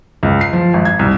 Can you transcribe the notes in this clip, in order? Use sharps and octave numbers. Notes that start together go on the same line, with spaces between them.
C#2
C7
F3
G#1
G#6
C2